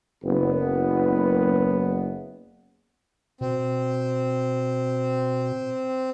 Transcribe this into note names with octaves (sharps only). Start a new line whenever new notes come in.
F#1 B3
B2 C4